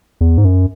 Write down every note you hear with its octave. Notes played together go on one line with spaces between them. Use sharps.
E2
G#2
F#2